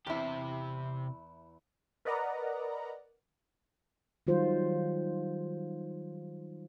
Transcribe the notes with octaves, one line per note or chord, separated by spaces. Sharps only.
E2 C3 E4 G4
A#4 B4 D5 D#5 F#5 A#5
D#3 F#3 G3 F4 C5